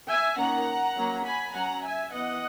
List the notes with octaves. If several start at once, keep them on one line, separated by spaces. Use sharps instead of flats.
E5 G#5
D#3 A#3 C#4 F#5 A#5
F#3 A#3 C#4
G#5 B5
F#3 C#4 F#5 A#5
E5 G#5
E3 B3 D#5 F#5